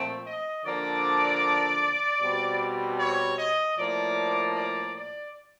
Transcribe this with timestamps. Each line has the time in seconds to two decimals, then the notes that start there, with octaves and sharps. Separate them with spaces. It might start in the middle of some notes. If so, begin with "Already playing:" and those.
Already playing: A#2 F3 A3 C4
0.25 D#5
0.65 D3 F3 A#3 D5
2.21 B2 G3 C4
2.99 C#5
3.39 D#5
3.77 A2 F3 A#3 D5
4.56 D5
4.95 D5